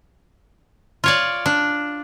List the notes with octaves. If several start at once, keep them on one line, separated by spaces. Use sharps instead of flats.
F4 C#5 D5
D4